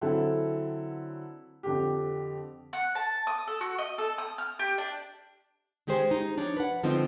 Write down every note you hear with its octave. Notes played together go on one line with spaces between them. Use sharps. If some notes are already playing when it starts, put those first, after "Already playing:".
D3 F#3 C4 E4 A4
F2 D3 G4
F#5
A5
D#6
A4
F#4
D#5
A4
D#6
F6
G4
D4
D#3 G#3 G4 G#4 C5
D#4
F3 D4 C#5
B4 F#5
D3 F3 G#3 C4 D#4